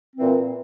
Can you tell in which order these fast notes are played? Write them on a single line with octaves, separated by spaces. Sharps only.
C4 E3 A#2